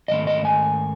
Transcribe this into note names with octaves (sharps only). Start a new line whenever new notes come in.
G#2 D#3 A3 C#4 D#5
D#5
G#5